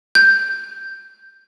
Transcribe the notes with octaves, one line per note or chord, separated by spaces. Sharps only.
G6